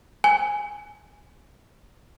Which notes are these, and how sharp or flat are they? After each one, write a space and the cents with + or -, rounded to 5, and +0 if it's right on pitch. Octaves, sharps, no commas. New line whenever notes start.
G#5 +0